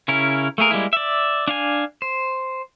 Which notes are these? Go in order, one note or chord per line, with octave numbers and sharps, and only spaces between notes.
C#3 C#4 E4 A#4
A3 A#3 G#4 A#4
G3 G#3 A#3 E4
D5 E5
D4 F5 G#5
C5